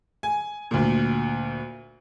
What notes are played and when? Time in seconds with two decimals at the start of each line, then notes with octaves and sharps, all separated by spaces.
0.23 G#5
0.71 D2 A#2